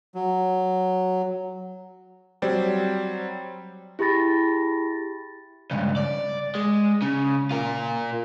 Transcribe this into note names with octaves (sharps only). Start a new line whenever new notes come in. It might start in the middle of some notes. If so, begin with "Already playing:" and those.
F#3
F#3 G3 C4 C5 D5
E4 G4 G#4 B5 A6 A#6
C#2 G2
D5
G#3
C#3
F4 A#4